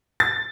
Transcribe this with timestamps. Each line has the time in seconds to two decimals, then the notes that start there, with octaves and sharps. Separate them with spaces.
0.20 A6